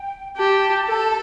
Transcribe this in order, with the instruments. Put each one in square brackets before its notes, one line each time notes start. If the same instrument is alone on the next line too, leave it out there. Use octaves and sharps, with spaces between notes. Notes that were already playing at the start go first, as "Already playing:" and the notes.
Already playing: [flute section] G5
[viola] G4 [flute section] A5
[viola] A4